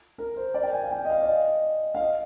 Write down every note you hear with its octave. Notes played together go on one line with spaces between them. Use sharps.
A#4
C5
D5
G5
G#5
F5
G5
D#5
F5
D5
D#5
F5
D#5